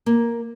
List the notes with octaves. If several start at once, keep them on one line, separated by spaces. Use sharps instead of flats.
A#3